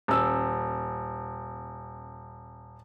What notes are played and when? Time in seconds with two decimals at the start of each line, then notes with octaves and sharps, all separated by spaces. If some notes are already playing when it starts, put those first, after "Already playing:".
0.08 D#1 E6